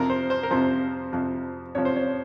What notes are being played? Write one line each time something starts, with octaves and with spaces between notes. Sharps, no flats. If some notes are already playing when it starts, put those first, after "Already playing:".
Already playing: F2 C3 F3 A#4
C5
C5
A#4
F2 C3 F3 C5
F2 C3 F3
F2 C3 F3 C#5
C5
C#5